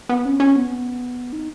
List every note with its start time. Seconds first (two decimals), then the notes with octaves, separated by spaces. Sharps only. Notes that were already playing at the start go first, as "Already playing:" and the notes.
0.09 B3
0.25 C#4
0.40 C#4
0.56 B3
1.33 D#4